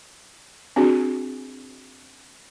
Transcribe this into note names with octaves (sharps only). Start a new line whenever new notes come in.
C4 D4 F#4 G#4